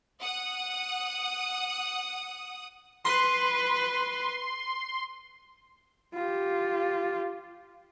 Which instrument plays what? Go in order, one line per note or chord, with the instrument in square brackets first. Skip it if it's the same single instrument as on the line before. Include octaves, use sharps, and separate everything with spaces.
[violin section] F#5 D#6
[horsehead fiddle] B4 [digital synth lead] C6
[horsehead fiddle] F4 G4